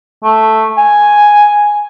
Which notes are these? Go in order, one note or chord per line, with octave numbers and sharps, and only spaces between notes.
A3
G#5